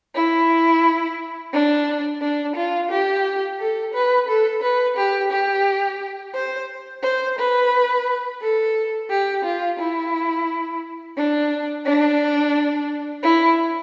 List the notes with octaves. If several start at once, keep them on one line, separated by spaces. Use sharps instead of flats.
E4
D4
D4
F4
G4
A4
B4
A4
B4
G4
G4
C5
C5
B4
A4
G4
F4
E4
D4
D4
E4